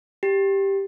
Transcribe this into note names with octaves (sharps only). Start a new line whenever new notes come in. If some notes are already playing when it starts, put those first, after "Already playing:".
G4